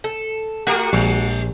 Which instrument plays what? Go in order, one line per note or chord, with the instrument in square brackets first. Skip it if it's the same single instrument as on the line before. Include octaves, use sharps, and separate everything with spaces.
[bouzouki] A4
[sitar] A3 G4 A#4 [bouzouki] F#4
[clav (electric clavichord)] A#1 [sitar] G3